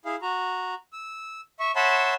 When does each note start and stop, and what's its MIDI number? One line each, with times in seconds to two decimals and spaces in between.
0.05 0.16 64
0.05 0.16 68
0.05 0.16 77
0.22 0.74 66
0.22 0.74 82
0.93 1.41 88
1.60 1.72 76
1.60 1.72 85
1.76 2.14 73
1.76 2.14 76
1.76 2.14 78
1.76 2.14 81
1.76 2.14 83
1.76 2.14 84